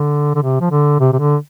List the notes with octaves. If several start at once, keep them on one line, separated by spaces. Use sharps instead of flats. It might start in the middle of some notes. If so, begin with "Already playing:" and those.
Already playing: D3
D3
C3
F3
D3
C3
C3
D3